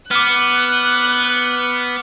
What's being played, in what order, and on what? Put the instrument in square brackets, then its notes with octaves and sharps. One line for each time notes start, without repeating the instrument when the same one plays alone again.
[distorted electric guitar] B3 [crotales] D6 F6 [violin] F#6